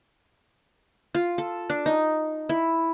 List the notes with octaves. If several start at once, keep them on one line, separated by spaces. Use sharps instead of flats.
F4
A4
D4
D#4
E4